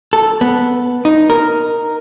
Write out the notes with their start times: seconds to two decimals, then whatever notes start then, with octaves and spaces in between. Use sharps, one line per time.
0.13 A4
0.41 B3
1.05 D#4
1.30 A#4